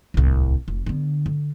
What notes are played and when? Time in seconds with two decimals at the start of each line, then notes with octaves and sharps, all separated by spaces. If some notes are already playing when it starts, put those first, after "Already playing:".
0.14 D1 C2
0.68 F1
0.86 D3 B3
1.26 D3